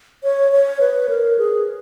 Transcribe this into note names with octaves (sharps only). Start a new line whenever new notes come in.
C#5
C#5
B4
A#4
G#4